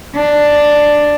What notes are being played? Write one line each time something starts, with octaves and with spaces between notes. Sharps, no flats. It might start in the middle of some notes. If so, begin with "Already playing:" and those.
D4